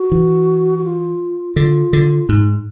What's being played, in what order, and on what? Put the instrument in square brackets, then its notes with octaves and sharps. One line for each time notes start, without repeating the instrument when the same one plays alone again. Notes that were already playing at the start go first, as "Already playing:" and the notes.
Already playing: [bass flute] F#4
[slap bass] E3
[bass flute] F#4
F4
[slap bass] D3 [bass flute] F4
[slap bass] D3
[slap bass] G#2 [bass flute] D#4